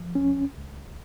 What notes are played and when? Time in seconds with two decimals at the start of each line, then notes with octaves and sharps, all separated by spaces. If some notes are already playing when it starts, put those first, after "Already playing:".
Already playing: F3
0.15 C#2 C#4
0.56 C#2